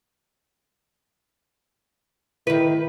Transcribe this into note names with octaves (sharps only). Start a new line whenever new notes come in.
D#3 E4 B4